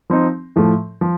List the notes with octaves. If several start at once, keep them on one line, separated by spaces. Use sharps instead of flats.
F3 C4 D#4
A2 F3 A3
F3